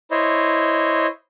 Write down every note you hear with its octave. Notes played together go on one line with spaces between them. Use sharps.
E4 C5 C#5 D#5